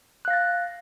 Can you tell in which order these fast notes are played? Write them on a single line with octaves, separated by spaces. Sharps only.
F#6 F5 A#6 A6